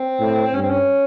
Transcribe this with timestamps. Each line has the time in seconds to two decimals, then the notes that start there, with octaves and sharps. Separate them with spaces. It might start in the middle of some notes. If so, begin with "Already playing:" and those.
Already playing: C4
0.19 A2
0.54 G2 C#4
0.62 C4
0.70 C#4